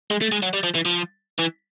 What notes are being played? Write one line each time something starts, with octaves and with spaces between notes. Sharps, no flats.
G#3
A3
G#3
F#3
G3
F3
E3
F3
E3